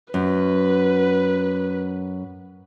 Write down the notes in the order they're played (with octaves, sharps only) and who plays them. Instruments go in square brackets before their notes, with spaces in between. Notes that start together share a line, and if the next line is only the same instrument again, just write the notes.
[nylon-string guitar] F#2 [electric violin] B4